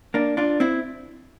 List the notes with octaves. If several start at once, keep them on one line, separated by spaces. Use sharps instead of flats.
A#3 D4
D4 F4
C4 E4